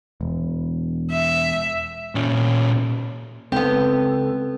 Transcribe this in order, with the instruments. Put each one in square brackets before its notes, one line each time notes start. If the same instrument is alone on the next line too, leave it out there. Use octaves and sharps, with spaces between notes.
[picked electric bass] E1
[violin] E5
[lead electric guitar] A#2 C#4
[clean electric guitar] C#2 [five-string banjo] B3 G4 [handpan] C4 [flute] A4